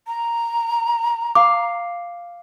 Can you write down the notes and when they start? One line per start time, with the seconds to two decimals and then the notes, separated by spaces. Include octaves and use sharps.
0.07 A#5
1.35 F5 D6